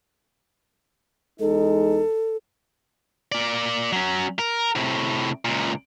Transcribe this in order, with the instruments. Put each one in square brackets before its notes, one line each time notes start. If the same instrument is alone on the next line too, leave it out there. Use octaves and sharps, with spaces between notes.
[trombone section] E2 G#3 D#4 [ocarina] A4
[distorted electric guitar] A#3 D5
F#3 C#4
A#4
A2 C3
C#2 A#2